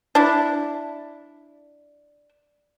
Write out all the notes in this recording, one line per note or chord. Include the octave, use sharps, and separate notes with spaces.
D4 E4